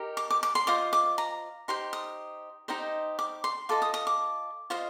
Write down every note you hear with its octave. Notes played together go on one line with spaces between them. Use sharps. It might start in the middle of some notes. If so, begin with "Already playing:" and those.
Already playing: D#4 G4 A#4
D6
D6
D6
C6
F4 C5 D#5 D6
D6
A#5
D#4 G4 C5 C6
D#6
D#4 G4 C5 D#5
D6
C6
F4 A4 D#5 D6
D#6
D#6
D6
F4 C5 D#5